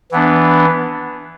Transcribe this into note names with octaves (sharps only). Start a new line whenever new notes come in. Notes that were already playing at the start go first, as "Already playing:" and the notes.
E3 B3 D4